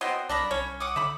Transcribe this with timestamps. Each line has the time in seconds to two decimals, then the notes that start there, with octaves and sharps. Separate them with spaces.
0.01 F#3 B3 C4 D#5 C6
0.29 C2 D4 A4 A#4 B5
0.51 C2 C#4 C#5
0.80 F#5 D6 D#6
0.96 D3 E5 B5